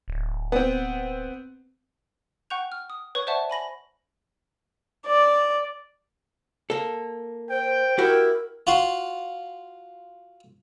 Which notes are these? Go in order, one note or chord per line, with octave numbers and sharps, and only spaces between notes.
D1
B3 C4
F#5 G5 C#6 F#6 G6 F7
F6
D#6
B4 C#5 C#6 F#6
C5 D5 E5 F#5 A5 C#6
G#5 B5 A#6 F#7
D5
A#3 A4
C5 G5
E4 F#4 G4 A#4
F4 F#4 C6